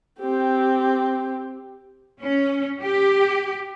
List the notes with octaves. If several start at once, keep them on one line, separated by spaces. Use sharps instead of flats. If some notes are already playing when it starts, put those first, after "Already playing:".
C4 G4
C#4
G4